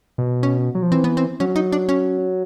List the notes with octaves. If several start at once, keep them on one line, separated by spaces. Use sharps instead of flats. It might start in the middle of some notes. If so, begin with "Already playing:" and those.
B2
C#4
F#3
F3
E3 C4
B3
C4
F#3 C#4
D#4
D4
C#4